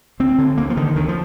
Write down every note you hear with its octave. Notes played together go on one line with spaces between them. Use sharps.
D2 C4
D3
D2 A#3
F3
D3 D#3
D2 D#3
F3